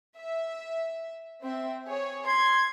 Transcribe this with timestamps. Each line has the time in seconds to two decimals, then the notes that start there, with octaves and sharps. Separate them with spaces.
0.17 E5
1.41 C4 E5
1.87 G#4 C#5
2.26 C6 G#6